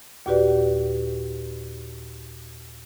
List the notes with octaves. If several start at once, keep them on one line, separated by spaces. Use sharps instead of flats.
D#2 A#2 F#4 G4 B4 D5